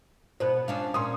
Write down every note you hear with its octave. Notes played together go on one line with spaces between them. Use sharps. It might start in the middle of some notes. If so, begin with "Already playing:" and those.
B2 B3 C5
C#4 D4 F4
A#2 C#4 C6 D#6